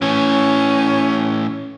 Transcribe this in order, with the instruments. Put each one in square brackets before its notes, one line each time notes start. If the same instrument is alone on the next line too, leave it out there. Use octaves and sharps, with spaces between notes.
[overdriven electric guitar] A2 E3 [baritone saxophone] C#4